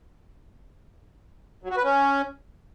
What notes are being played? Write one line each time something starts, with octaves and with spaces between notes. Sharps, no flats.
F#3
F#4
B4
C#4